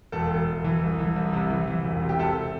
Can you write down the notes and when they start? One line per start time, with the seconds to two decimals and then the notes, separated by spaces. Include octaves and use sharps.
0.12 E1 A4
0.30 E1
0.47 E1
0.64 E3
0.81 C2
0.99 E3
1.16 C2
1.33 C3
1.50 E3
1.67 E3
1.85 E1
2.02 C3
2.09 G4
2.19 C3 A4